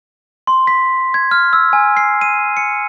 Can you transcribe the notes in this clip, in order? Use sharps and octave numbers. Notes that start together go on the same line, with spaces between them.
C6
B6
G#6
F6
E6
G#5
C7
D#7
C#7